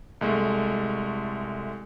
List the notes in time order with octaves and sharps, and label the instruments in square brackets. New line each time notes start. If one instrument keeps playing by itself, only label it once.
[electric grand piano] C2 G#3 A3